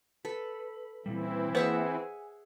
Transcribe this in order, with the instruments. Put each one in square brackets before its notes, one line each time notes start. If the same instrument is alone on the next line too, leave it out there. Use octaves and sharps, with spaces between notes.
[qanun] A4 [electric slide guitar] B4
[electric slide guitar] A#2 G3 [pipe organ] E3 C4 E4
[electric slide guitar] A#3 [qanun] G#4 E5 F#5 [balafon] B4 C5
[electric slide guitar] G#5